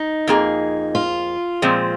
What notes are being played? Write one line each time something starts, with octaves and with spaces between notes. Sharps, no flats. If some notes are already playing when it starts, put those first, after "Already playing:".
Already playing: D#4
F2 F3 A#3 G#4
F4
A#2 F3 G#3 C4